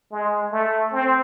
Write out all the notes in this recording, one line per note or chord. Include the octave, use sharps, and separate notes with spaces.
G#3
A3
C4